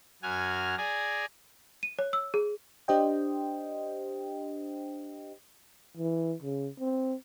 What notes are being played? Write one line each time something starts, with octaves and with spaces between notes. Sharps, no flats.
F#2 F#4 G#5 F6
G#4 D5 G#5 A#5
D#7
C#5
E6
G#4
D4 G4 C5 D#5 G5
E3
C#3
C4